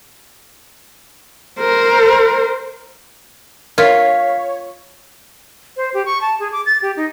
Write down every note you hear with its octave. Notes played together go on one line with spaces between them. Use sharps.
A#4 C5
F4 A#4 C#5 F5 B6
C5
G4
C#6
A5
G#4
D6
A6
G4
D#4